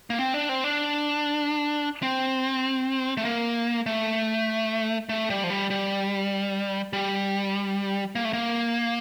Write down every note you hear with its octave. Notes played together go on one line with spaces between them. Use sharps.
A#3
C4
D4
C4
D4
C4
A3
A#3
A3
A3
G3
F3
G3
G3
G3
A#3
A3
A#3